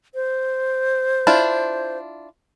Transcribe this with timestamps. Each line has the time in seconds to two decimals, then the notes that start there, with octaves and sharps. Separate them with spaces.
0.15 C5
1.27 D4 E4 F4